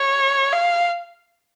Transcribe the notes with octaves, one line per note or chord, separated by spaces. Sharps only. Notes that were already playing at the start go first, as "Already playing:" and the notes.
Already playing: C#5
F5